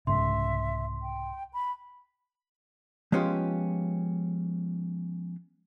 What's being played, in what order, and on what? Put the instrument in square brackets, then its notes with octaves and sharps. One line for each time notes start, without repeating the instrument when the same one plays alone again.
[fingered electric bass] C2 G#2 C#3 [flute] E5 [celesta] C6
[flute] G5
B5
[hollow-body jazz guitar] F3 G#3 B3 C#4 F4 G4